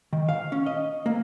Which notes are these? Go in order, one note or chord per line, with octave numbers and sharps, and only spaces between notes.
D#3
F5
C#4
D#5
A#3